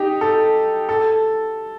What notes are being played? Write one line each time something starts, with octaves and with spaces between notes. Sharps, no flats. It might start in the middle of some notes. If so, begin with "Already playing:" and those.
Already playing: D#4 G4
A4
A4